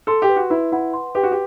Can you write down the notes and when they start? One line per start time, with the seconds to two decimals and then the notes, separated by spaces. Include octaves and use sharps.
0.07 A4 C6
0.22 G4
0.29 B4
0.36 F#4
0.50 E4 B4
0.72 E4 F#5
0.93 C6
1.15 G4 B4
1.23 F#4
1.31 G4